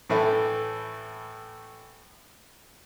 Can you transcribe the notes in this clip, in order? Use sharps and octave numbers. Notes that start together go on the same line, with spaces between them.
A2 E3 A3